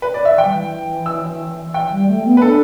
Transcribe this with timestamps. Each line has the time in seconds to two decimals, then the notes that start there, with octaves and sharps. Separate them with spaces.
0.02 B4
0.14 D5
0.25 E5
0.37 E3 G5
0.44 G3
0.52 E3
1.06 E6
1.74 E3 G5
1.91 G3
2.08 A3
2.25 B3
2.37 B4
2.42 D4 A4